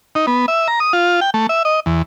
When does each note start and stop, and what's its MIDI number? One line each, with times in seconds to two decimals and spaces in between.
0.15 0.26 63
0.27 0.46 59
0.48 0.68 76
0.68 0.80 82
0.80 0.93 87
0.93 1.20 65
1.21 1.30 79
1.34 1.47 57
1.49 1.63 76
1.65 1.80 75
1.86 2.02 40